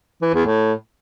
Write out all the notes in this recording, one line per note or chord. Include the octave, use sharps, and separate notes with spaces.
E3
E2
A2